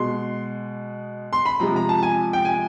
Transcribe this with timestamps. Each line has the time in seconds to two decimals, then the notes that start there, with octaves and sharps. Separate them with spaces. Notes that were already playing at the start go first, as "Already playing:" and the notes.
Already playing: B2 G#3 C6
1.33 C6
1.46 B5
1.60 C3 F3 G#3 A#5
1.76 A#5
1.89 A5
2.03 G#5
2.33 G5
2.45 G#5